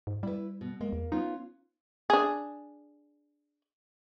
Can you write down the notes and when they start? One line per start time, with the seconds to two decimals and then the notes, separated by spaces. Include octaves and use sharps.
0.07 G#2
0.23 G3 E4 B4
0.61 B2
0.81 G#3 A#3
0.93 E2
1.12 B3 C#4 D#4 F4
2.10 D4 G#4